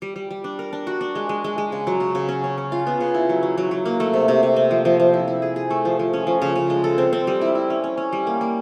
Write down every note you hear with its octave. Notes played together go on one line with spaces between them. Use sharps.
G3
G3
G3
D4
A#4
D4
F#4
D4
G#3
G#3
G#3
G#3
C#3
F#3
C#3
C#3
C#4
C#4
C#4
F4
B3
C#3
E4
F#3
F#3
F#3
F#3
A#3
A3
C3
C3
C3
C4
F3
F3
F3
E4
E4
G#4
G#4
A3
F3
F3
C#4
F3
C#3
C#3
G#3
A4
C4
C4
G3
E4
E4
C#4
C#4
C#4
G3
A#3
A#3